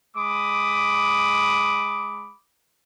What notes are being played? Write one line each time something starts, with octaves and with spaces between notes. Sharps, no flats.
G#3 B5 D6 D#6